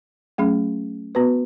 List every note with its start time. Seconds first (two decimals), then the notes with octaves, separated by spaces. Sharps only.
0.38 F#3 A3 C#4 G#4
1.15 B3 F#4 B4